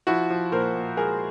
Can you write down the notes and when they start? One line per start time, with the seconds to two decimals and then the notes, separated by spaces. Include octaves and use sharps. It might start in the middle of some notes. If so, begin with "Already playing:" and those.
0.07 F3 E4 F#4
0.30 F3
0.52 A#2 A#4 C5
0.75 A#2
0.97 G#3 G#4 A#4